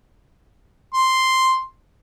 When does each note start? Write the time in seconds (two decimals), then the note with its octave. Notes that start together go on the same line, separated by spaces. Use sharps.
0.94 C6